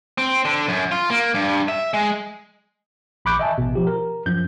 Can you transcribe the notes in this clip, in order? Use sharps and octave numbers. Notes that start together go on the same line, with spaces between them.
C4
D3
F#2
F4
A#3
G2
E5
G#3
A#1 B5 C#6 D6 F#6 G6
D#5 E5 G#5 A5
A1 B2
F3 G4
A#4
F#2 F3 G6